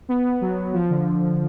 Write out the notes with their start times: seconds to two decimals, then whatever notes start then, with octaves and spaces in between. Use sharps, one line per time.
0.09 B3
0.41 F#3
0.73 F3
0.90 D3